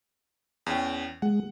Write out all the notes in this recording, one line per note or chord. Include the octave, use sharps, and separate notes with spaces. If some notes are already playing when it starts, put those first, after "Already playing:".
E2 C#4 G5
G#3 F#5